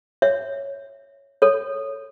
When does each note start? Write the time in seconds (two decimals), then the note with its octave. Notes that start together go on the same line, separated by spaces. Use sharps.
0.22 C#5 E5
1.42 A4 C#5